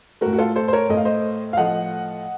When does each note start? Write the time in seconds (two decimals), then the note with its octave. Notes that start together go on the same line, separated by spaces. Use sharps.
0.21 A2 A3 F#4 A#4
0.33 F#4
0.39 F4 A4
0.56 A4 C5
0.68 C5
0.73 A#4 C#5
0.89 A2 A3 D#5
0.97 F5
1.05 C5 D#5
1.53 F5
1.57 A2 F3 A3 D#5 F#5